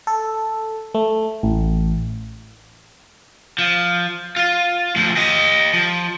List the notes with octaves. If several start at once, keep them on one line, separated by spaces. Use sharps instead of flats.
A4
A3
A1
F3
F4
D2 F3
G4 D#5
F3